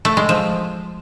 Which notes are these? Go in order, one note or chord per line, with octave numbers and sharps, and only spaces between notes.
A3
G#3
F3